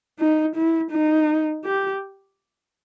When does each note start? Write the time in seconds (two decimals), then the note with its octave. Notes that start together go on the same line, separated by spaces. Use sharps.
0.20 D#4
0.56 E4
0.92 D#4
1.65 G4